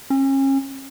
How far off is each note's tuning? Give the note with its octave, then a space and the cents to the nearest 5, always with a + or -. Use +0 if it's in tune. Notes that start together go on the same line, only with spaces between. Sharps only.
C#4 -35